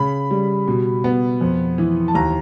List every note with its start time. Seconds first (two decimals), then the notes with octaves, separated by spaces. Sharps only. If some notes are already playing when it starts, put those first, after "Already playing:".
Already playing: C#3 B5
0.31 G3
0.68 B2
1.04 B3
1.41 F2
1.78 E3
2.08 A5
2.15 D#2 A#5